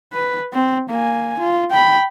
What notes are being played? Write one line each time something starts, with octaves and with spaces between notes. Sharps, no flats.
B4
C4
A#3 G#5
F4
G5 B5